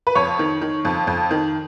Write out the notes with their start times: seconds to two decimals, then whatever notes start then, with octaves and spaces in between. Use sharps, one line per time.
0.07 B4
0.15 F2 C#5
0.39 D#3
0.61 D#3
0.85 F2
1.07 F2
1.31 D#3